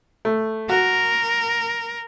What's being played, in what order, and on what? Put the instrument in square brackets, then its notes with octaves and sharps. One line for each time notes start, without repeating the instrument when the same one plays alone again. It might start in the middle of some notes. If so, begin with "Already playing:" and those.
[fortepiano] A3
[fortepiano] F#4 [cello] A#4